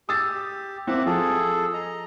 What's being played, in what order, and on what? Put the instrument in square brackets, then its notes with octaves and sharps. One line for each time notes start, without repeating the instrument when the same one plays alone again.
[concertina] G4 [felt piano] D#6 E6 A6
[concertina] A#3 E5 F#5 [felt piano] C4
[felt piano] F3 [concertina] G#4 A4
[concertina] D#5 A#5